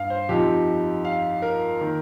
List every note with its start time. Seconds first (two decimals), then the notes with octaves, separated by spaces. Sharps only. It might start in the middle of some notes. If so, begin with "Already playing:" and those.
Already playing: G2 F5
0.10 C5
0.29 F2 F3 D#4 G4
1.05 F5
1.42 A#4
1.81 D#3 A#3